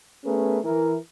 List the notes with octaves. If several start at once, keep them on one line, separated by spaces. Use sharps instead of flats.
A3 B3 C#4 G#4 A#4 B4
E3 A#4